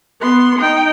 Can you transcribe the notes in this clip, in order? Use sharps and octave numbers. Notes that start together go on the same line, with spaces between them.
B3 C6
D#4 G5